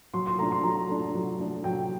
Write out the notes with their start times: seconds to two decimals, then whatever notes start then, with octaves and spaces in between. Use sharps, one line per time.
0.14 F#3 C6
0.27 C6
0.39 A3 D4 A#5
0.52 C6
0.63 F#3 A#5
0.89 A3 D4
1.14 F#3
1.40 A3 D4
1.64 F#3 G5